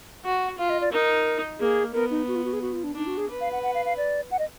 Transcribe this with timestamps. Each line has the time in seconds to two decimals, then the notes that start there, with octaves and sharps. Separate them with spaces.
0.25 F#4 F#5
0.58 F4 F5
0.70 D#5
0.81 D5
0.92 D#4 A#4
1.60 A#3 G#4
1.93 B3 A#4
2.11 D#4
2.28 F#4
2.36 F4
2.45 F#4
2.53 G#4
2.62 F#4
2.73 F4
2.84 D4
2.95 D4 D#4
3.07 F#4
3.17 G#4
3.30 B4
3.41 F5
3.52 F#5
3.63 F#5
3.75 F5
3.85 F5
3.97 D5
4.31 F#5
4.39 D#5